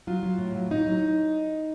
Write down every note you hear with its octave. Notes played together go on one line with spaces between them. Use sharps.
F#3 F4
F#3
A2
F#3
F#3 D#4
F#3